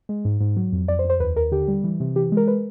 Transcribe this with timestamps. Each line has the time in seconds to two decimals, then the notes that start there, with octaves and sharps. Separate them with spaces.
0.09 G#3
0.25 G#2
0.40 G#2
0.56 F#3
0.72 F2
0.88 F2 D5
0.99 C5
1.04 F2
1.10 C5
1.20 D#2 B4
1.36 D#2 A#4
1.52 D3 G4
1.68 G3
1.84 E3
2.00 C3
2.16 E3 G4
2.32 G#3
2.37 A#4
2.48 B4